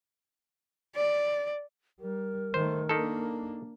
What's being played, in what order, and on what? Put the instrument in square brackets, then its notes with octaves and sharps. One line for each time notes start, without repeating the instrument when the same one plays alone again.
[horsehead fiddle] D5
[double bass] G3 [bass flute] A#4
[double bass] D#3 A3 [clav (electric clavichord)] C5
[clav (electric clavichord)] D#3 A4 [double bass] A#3 D4